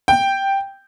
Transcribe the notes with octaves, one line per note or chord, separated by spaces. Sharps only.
G5